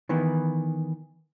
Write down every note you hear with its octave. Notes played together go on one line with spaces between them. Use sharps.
D#3 E3 B3